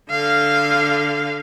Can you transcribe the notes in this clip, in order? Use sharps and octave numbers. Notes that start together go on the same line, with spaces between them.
D3 F5